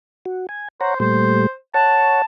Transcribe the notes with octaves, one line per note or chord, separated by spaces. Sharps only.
F#4
G#5
C5 C#5 F#5 A#5
A#2 G3 A3 C5
C#5 F#5 A5